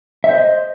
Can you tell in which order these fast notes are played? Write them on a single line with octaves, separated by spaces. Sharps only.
E5 C5 D#5